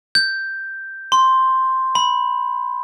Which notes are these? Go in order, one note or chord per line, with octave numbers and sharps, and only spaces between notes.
G6
C6
B5